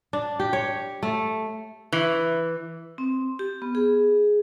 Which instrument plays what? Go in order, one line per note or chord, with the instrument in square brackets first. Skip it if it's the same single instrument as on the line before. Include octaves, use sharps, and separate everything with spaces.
[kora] D4
G4
C#5
A3
[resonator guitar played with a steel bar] E3
[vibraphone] C4
G4
B3
G#4